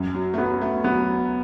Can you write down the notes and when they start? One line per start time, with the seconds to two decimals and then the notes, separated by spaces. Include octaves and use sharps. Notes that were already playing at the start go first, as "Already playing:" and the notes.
Already playing: F#2
0.15 F#3
0.34 A3
0.38 F#3 B3
0.61 A3
0.84 F#3 B3